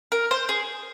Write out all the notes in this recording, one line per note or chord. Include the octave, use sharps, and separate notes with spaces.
A#4
C5
G#4